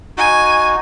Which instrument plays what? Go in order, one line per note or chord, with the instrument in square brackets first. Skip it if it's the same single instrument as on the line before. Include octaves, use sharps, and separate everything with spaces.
[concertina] D#4 F#4 [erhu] G#5